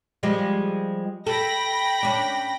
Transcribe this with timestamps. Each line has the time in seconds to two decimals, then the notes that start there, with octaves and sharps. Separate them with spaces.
0.23 F3 G3 G#3
1.27 A4 G5 B5 A#6
2.03 C#4 D4